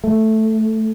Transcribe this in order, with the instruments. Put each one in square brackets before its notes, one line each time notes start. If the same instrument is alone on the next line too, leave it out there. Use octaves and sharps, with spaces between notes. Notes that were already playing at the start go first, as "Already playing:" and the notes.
[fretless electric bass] A3